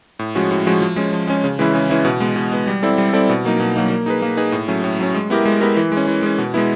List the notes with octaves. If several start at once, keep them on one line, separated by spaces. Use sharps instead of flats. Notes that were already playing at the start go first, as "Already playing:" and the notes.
A2
F3 G#3 C#4 F#4
A2
F3 G#3 C#4 F#4
F3
G#3 C#4
F3
G#3 C#4
C#3
E3 G#3 C#4 E4
C#3
E3 G#3 C#4 E4
B2
G#3 B3
B2
G#3 B3
G3
C4 E4 A4 D5
G3
C4 E4 A4 D5
B2
F#3 A#3 D#4
B2
F#3 A#3 D#4
A#3
D#4 G#4 B4
A#3
D#4 G#4 B4
A2
F#3 A3 C#4
A2
F#3 A3 C#4
G#3
B3 E4 G4 A#4
G#3
B3 E4 G4 A#4
E3
G#3
C#4
E3
G#3 C#4
B2
G#3 B3 E4